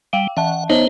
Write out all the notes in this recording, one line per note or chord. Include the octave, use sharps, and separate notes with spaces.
G3 F5 G5
E3 E5 F#5 A5
B3 D#4 C5 C#5